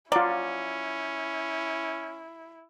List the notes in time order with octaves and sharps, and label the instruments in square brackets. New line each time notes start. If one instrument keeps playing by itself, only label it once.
[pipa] F#3 [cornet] C#4 [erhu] E4 [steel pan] F4 D5